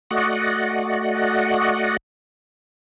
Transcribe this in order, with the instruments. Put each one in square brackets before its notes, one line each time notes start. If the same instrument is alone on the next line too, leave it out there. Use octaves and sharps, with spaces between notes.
[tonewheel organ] A3 F#4 D5 D#5 F#5